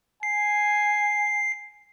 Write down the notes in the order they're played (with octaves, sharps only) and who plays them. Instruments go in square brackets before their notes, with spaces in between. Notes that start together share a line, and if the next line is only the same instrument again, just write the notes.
[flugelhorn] G#5 [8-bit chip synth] C7